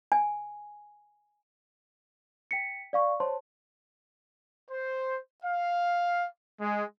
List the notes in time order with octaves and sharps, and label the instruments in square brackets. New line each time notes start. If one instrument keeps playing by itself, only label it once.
[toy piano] G#5
[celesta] G5 B6 C#7
D5 F5 C#6
C5 C#5 A5 C6
[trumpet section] C5
F5
G#3